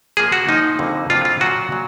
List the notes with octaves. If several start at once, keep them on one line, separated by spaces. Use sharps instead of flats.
A#2 F3 A#3 G#4
F#4
A#2 F3 A#3 D#4
F2 D3 F#3 A#3
F2 D3 F#3 A#3 F4
F4
A#2 F#3 A#3 F#4
A#2 F#3